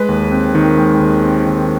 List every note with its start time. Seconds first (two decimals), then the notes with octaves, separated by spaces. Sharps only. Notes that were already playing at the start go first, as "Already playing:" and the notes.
Already playing: G#3 B4
0.09 D#2
0.31 C4
0.55 D#3
0.78 G#3
1.00 D#2
1.24 C4
1.46 D#3